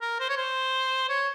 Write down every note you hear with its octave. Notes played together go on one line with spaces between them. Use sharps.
A#4
C5
C#5
C5
C#5